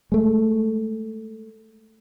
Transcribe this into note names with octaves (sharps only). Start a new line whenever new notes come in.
G#3 A3